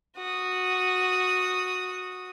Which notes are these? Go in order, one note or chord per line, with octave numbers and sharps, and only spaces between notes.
F#4 D#6